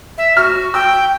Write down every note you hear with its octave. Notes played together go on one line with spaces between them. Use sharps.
E5
F#4 F6
G5 E6